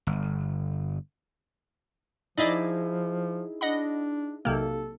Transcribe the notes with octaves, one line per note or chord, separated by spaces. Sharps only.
G1
F3 D#4 E4 G#4 D5 D#5 D6
D4 D#5 F#5 B5
B1 C3 A#3 A4